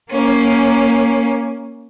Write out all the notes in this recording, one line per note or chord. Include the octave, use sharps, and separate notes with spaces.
A#3 C#4